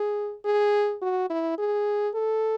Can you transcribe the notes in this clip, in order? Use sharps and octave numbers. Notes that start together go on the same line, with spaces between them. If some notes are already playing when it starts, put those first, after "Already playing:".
Already playing: G#4
G#4
F#4
E4
G#4
A4